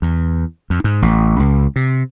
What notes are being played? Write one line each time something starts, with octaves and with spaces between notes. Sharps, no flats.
E2
F2
G#2
A1
C#2
C3